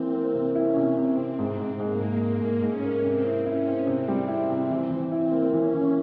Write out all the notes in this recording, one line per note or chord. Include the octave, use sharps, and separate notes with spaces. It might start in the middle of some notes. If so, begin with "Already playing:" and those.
Already playing: E3 A#3 C4
A#3
C3
C#4 E4
C3
C3 C4
C3
G#2 C4
G#2
G#2 A#3
G#2
G#2 A#3
G#2
G#2 C#4
A#3
C3 C4
E4
C#4 E4
C4
C3 C4
G3
E4
C3
E3
E3
C4 E4
A#3
E3 C#4
E3